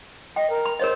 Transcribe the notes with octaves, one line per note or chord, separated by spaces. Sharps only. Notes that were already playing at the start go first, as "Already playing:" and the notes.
D#5 G5
A#4
B5
A#4 C5 C#5 D#5